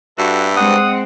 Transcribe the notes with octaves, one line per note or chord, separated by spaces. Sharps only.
G2 F#4 A4 E5
G#3 C4 F#5 D#6